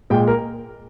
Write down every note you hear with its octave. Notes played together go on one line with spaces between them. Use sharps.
A#2 G#3 G5
A#4